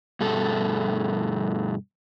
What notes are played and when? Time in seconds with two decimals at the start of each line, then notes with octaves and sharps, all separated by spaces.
0.20 G2 B2 A4